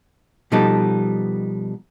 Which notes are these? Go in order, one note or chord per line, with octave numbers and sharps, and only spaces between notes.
B2 F3 G3 B3 D#4 A4